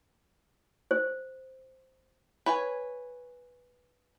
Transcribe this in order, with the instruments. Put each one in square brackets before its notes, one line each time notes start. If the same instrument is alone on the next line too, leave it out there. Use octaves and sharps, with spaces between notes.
[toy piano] C5
[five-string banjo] B4 C#5 G#5